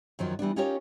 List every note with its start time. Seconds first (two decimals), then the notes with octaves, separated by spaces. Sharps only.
0.19 F#2 D#3 F3 F#3
0.39 E3 G3 B3 D4
0.56 C#4 D#4 F4 G4 A#4 C#5